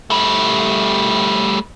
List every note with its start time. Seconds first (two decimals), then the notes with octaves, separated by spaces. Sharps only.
0.10 G3 A3